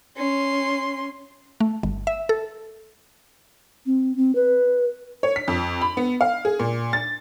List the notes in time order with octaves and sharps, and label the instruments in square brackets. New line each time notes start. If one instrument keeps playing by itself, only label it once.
[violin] C#4 C6
[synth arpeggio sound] A3
G1
E5
A4
[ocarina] C4
C4
B4
[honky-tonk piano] C#5
B6
F2
B5
B3
F5
G#4
A#2
A6